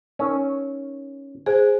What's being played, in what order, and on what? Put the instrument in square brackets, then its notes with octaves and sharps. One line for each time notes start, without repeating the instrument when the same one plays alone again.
[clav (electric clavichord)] C#4 [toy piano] D#4 A#4
[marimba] G#4 [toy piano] C5 G#5